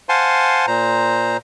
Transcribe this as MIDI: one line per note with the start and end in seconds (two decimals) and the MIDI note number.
0.09 0.66 72
0.09 0.66 77
0.09 0.66 78
0.09 0.66 80
0.09 0.66 81
0.09 0.66 84
0.67 1.37 46
0.67 1.37 72
0.67 1.37 82